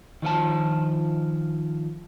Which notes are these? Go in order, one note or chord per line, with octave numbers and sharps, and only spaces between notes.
D#3 F3 F4 A5